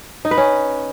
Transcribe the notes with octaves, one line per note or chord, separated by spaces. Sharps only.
D#4
B4
C#4